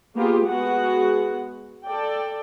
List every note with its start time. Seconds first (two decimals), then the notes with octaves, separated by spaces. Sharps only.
0.15 A#3 B3 F4 G4 G#4
0.46 G#3 B3 F#4 G#4 F#5
1.85 A4 D5 G5